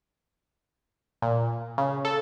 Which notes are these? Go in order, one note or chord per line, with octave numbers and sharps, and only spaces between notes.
A#2
C#3
A4